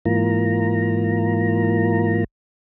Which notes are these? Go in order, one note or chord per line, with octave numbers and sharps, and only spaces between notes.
G#2 E3 A#3 F4 A#5